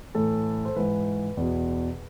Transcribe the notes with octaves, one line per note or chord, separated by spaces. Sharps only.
A2 E3 A4
C5
G#2 E3 B4
E2 B2